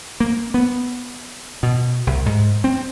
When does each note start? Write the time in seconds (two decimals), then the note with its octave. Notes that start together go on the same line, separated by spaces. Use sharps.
0.20 A#3
0.54 B3
1.63 B2
2.07 C2
2.26 G#2
2.64 C4